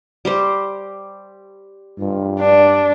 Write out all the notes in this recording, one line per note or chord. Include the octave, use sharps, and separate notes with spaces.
G3 G4 C5
G2 F4
D4 D5